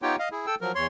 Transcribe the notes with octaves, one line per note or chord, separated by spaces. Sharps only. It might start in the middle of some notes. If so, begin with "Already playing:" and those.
B3 D#4 F4 G4 C#5 G5
D#5 F5
E4 G#4
A4 G5 E6
F3 F#3 A#4
E2 C#5 C6